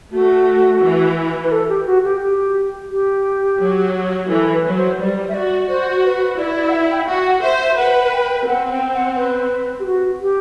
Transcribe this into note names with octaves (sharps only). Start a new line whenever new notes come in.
A3 F#4
E3
B4
A4
G4
F#4
G4
G4
G4
F#3
E3 A4
B4
F#3
C5
G3 D5
E5
F#4 D5
F#4 C5
B4
E4 D5
D5
F#5
E5
G5
E5
F#4 F#5
F#5
C5 E5
E5
B4 F#5
G5
C4 F#5
G5
F#5
B4
G4
F#4
G4